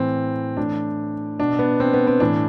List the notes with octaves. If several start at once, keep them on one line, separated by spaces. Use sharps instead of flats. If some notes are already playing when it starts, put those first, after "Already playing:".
Already playing: A2 E3 C4
A2 E3 D4
B2 D4
B3
C4
B3
C4
A2 E3 D4